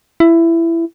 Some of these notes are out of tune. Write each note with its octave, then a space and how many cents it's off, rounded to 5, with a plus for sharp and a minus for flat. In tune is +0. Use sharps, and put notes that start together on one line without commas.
E4 +15